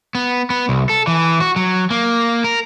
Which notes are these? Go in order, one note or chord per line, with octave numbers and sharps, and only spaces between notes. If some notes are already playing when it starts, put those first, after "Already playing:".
B3
B3
C2
A4
E3
F#4
F#3
A#3
A#4